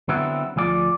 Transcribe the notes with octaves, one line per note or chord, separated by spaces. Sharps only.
D3 F#3 B3 C4 E4
D2 F3 G#4 D5